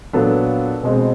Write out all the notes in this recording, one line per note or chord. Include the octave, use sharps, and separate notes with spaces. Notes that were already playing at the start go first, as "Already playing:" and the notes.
A#2 F#3 B3 D4 A4
B2 G#3 C4